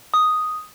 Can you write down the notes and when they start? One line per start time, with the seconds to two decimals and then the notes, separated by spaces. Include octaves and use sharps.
0.14 D#6